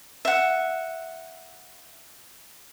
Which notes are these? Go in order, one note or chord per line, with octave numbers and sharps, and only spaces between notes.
E5 F#5